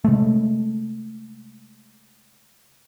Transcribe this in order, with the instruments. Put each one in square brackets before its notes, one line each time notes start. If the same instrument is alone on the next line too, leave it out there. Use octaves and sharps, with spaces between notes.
[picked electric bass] C3 G#3 A3